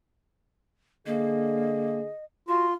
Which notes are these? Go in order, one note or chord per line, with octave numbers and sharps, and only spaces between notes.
D3 A#3 G#4 D#5
F4 F#4 C6